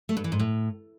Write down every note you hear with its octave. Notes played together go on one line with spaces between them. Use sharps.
A3
G2
E3
G#2
A2